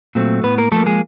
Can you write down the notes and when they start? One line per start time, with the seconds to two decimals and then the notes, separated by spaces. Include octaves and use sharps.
0.15 A#2 F#3 A3 C4
0.44 A2 B3 B4
0.58 A#3 A#4
0.72 F3 A3 A#3 A4
0.86 G#3 G#4